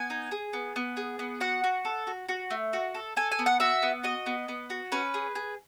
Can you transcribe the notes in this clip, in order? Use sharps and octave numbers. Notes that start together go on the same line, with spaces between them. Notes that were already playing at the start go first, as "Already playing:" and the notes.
Already playing: B3 G#5
D#4
G#4
B3
B3
G#4
B3
F#4 F#5
F#4
A4
F#4
F#4
A3
F#4
A4
A4 G#5
G#5
B3
F#5
F#4 E5
B3
F#4 D#5
B3
B3
F#4
C#4 B4
G#4
G#4